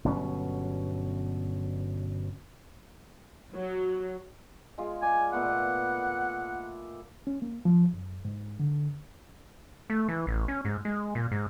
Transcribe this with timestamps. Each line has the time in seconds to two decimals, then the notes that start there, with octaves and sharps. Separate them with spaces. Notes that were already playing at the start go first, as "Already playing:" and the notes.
0.05 G1 B2 F#3 C#4
3.54 F#3
4.78 G#3 F4 G#4
5.02 D5 F5 G#5
5.33 A#2 A3 B3 F#5
7.27 C#4
7.42 A#3
7.65 F3
7.94 F#2
8.25 G#2
8.60 D3
9.90 A3
10.08 E3
10.27 A1
10.48 C#4
10.65 G#2
10.85 G#3
11.15 A#2
11.32 G#2